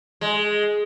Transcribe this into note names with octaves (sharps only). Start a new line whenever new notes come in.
G#3